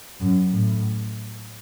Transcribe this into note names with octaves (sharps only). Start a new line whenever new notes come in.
F#2
A2